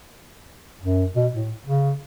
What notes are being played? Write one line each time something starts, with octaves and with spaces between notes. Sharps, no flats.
F#2
B2
A2
C#3